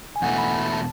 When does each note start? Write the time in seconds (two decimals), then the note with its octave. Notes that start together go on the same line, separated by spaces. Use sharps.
0.16 G#5
0.22 E2 B2 A3 E4 F#5
0.38 B5
0.53 A5
0.73 A5